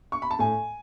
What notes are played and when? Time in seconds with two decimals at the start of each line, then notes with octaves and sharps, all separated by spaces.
0.12 C#6
0.22 B5
0.31 A5
0.39 A2 G#5